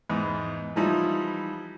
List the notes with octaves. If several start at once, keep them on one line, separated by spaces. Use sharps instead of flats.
E2 G#2 B5
E3 F3 G3 D#4 E4